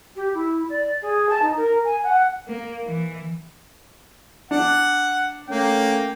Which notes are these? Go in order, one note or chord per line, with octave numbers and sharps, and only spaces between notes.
G4
E4
D5
G#4
A5
D#4
A#4
G#5
F#5
A#3
E3
D4 F#5
A3 A#3 C#4 G5